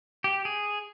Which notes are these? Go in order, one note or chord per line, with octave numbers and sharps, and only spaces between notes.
G4
G#4